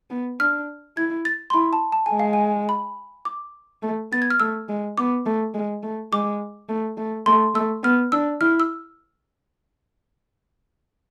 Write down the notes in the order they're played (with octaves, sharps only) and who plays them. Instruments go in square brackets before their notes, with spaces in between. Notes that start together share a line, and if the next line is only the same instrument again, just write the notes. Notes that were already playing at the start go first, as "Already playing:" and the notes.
[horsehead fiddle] B3
[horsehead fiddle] D4 [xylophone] F6
[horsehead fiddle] E4 [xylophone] G#6
[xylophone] A6
C6
[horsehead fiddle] E4 [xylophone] B5
[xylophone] A5
A5
[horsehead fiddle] G#3 [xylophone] G#5
[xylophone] F5
G#5
B5
D6
[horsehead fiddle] A3
[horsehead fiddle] B3 [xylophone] A6
[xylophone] G#6
F6
[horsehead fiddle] A3 [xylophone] E6
[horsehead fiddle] G#3
[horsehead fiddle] B3 [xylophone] D6
[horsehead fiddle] A3
G#3
A3
[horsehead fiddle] G#3 [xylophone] D6
[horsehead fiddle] A3
A3
[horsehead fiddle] A3 [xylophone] C6
[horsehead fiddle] A3 [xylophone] E6
[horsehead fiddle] B3 [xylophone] F6
[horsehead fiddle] D4 [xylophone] E6
[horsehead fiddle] E4 [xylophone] F6
[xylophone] E6